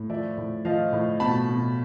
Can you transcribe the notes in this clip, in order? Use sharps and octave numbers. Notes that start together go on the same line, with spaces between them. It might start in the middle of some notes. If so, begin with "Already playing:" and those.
Already playing: A2
F3 D5 E5
A2
F3 D#5 F5
A2
B2 A5 B5
B2